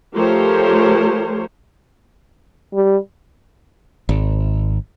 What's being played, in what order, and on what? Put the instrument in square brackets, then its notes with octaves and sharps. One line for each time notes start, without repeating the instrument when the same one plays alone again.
[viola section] F3 A3 G4 A#4 C5 C#5
[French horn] G3
[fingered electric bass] G#1